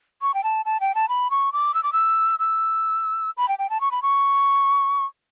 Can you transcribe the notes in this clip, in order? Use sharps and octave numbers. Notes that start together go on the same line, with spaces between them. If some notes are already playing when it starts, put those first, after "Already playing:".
C#6
G5
A5
A5
G5
A5
B5
C#6
D6
E6
D6
E6
E6
B5
G5
G5
A5
C#6
B5
C#6